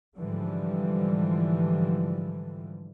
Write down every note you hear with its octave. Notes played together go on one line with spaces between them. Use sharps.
G#2 D3 E3 F3 G3